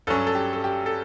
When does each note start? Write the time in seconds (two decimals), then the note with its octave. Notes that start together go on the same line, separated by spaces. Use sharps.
0.07 G2 F#3 C#4 A4
0.27 A4
0.35 G4
0.53 A4
0.64 G4
0.86 A4